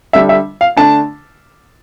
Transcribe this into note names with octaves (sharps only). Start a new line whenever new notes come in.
D3 G3 D4 E5
E5
F5
D3 A3 D4 A5